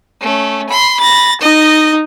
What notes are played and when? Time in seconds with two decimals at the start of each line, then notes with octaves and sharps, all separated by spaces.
0.21 A3 C#4
0.70 B5 C6
1.00 B5 A6 A#6
1.41 D#4 D#5 A#6